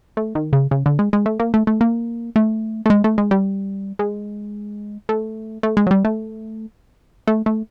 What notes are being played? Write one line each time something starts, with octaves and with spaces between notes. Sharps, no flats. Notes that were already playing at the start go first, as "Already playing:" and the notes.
A3
D#3
C#3
C#3
D3
G#3
G#3
A3
A#3
A3
A3
A#3
A3
A3
G#3
A3
G#3
G3
G#3
A3
A3
G#3
F#3
G3
A3
A3
A3